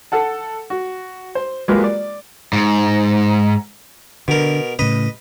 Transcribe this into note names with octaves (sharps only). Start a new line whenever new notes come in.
A4 F#5 A5
F#4
C5
F#3 G#3 A#3 F4 G4 B4
D5
G#2
B2 D3 A#4
A2 C#3 B4 D#5